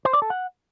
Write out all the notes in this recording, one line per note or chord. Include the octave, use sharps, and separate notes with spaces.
C5
D5
A4
F#5